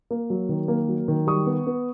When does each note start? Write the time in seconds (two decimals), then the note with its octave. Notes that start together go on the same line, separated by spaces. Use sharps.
0.11 A#3
0.30 F#3
0.49 D#3
0.68 A#3
0.89 F#3
1.08 D#3
1.27 G3 C#6 D#6
1.46 B3
1.67 B3